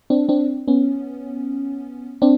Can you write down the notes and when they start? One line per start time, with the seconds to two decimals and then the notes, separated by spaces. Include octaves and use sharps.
0.10 C4 D4
0.29 C4 D4
0.68 B3 C#4
2.22 C4 D4